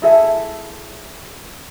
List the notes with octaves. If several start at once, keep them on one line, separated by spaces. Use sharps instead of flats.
E4 G#4 A4 E5